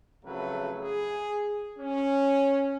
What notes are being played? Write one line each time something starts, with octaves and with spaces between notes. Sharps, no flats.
F2 C#3 F#3 A3 B4
G#4
C#4